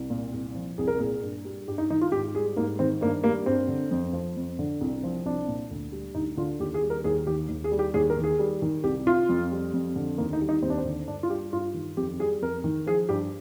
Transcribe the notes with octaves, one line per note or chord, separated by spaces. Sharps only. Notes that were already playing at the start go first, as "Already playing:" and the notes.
Already playing: C2
A#2
C2
F3
C2 G#4
A#4
A#2 G#4
G2
G3
G2 G4
D#4
D#3 D#4
F4
G#2 G4
G3 G#4
G#2 A#3
D#3 C4
G2 A#3
G3 A#3
G2 C4
D3
F2
F3
F2
D3
C2
F3
C2 D4
A#2
D2
G3
D2 D#4
D3 F4
D#2 G4
G#4
G3
A#4
D#2 G#4
D#3 G4
D#2
G#4
G3
G4
D#2 G#4
A#4
D#3
G#4
G3
D#3
C2 G4
C3 F4
F2
G3
F2
D3
D#2 A#3
D#4
G3
D#4
D#2 C4
D4
C4
D3
G2 D4
F4
G3 G4
G2 F4
D#3
F2 G4
G3 G#4
F2 A#4
D#3
F3 G#4
G2 G4